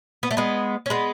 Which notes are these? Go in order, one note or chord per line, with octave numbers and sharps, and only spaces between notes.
B3
A3
G#3 B3
C#4
G#3 B3